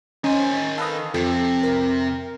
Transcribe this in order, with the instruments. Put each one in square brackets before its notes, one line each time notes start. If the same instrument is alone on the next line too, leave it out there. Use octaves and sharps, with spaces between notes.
[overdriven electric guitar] D#3 G#5 [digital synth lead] C#4 [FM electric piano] D#4 C5
[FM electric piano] A4 B4 D#5 [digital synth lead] F5
[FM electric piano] F2 [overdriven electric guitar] C3 [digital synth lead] A4
[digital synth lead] A#4